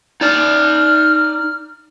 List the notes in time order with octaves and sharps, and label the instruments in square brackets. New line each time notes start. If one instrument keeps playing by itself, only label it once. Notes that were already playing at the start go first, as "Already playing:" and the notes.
[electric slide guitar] D#4 D5 [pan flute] F6